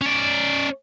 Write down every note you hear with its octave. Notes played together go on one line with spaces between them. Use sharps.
C#4 D5